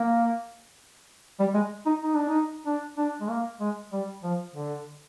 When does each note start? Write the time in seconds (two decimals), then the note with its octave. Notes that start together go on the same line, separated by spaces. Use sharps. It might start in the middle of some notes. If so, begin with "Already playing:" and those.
Already playing: A#3
1.40 G3
1.55 G#3
1.86 D#4
2.02 D#4
2.15 D4
2.29 D#4
2.67 D4
2.98 D4
3.21 G#3
3.30 A#3
3.61 G#3
3.93 G3
4.24 F3
4.55 D3